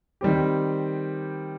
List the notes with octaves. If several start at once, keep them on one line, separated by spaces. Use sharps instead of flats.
D#3 G3 C4 G4